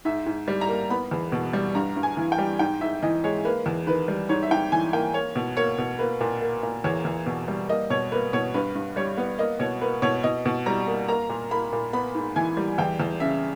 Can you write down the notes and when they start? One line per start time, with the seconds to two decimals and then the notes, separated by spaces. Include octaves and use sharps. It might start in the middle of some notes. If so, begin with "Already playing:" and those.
0.05 G#2 E5
0.26 G#2
0.48 G3
0.61 A#5
0.68 A#3
0.90 B3 B5
1.11 E2
1.32 B2
1.53 G3
1.75 G2 A#5
1.96 G2
2.03 G#5
2.17 E3
2.32 G5
2.38 G3
2.59 G#2 G5
2.81 G#2 E5
3.03 E3 D#5
3.24 G#3 C#5
3.45 A#3 B4
3.66 E2
3.87 D#3 B4
4.08 G3
4.29 G#2 C#5
4.43 E5
4.51 G#2 G5
4.72 E3 G#5
4.93 A#3 G5
5.14 A#3 C#5
5.35 B2
5.57 A#3 C#5
5.78 B2
5.99 A#3 B4
6.20 A#2
6.42 A#3
6.63 A#2
6.84 E2 C#5
7.05 E2
7.26 B2
7.48 G3
7.69 A#3 D#5
7.90 B2 C#5
8.12 A#3 B4
8.33 B2 C#5
8.54 G2 B4
8.75 G2
8.96 G3 C#5
9.17 B3
9.39 A#3 D#5
9.59 B2 C#5
9.81 A#3 B4
10.02 B2 C#5
10.24 B2 D#5
10.45 B2
10.66 G3 A#5
10.87 A#3
11.08 A#3 A#5
11.29 A#2
11.51 A#3 B5
11.72 A#2
11.93 B3 B5
12.15 G#2
12.36 E3 G#5
12.57 G3
12.78 E2 G5
13.00 E2
13.20 C#3 E5